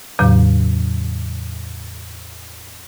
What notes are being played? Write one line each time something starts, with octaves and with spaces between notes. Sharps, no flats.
E2 A2 C#3 F#3